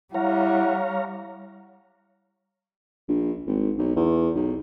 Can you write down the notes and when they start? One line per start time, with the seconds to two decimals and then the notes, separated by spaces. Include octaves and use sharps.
0.14 G3 E4 C#5 F5 F#5 A#5
3.08 A#1
3.47 G#1
3.78 B1
3.96 E2
4.35 B1